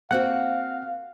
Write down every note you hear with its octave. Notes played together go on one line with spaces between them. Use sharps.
A#3 C4 F#4 F5 F#5 F#6